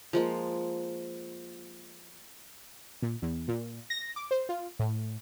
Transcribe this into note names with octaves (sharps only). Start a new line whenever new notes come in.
F3 G#3 A#3
A#2
E2
A#2
A#6
D6
C5
F4
A2